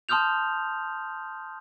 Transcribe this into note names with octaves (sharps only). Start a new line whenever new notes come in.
A5 C6 D#6 F6 G6 F7